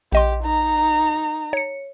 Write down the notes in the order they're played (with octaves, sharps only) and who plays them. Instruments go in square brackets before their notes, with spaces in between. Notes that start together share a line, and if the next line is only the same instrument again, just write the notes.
[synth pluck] A#1 D#5 C6 [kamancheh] G4
[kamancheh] D#4 A#5
[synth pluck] C#5 C#7